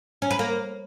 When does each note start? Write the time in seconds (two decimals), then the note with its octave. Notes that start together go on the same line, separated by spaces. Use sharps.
0.22 C#4
0.31 B4
0.39 A#3